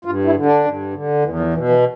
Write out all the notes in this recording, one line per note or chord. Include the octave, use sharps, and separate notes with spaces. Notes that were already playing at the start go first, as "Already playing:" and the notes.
G2 F4
E4
D3
D4
G2
D3
E2 E3
F3
B2 E3
E3